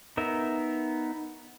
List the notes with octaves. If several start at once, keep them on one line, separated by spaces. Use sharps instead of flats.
B3 D#4 A#4 E5